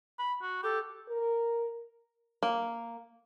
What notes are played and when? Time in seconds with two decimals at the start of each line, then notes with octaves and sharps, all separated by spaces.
0.19 B5
0.42 F#4
0.64 G4 A4
1.09 A#4
2.43 A#3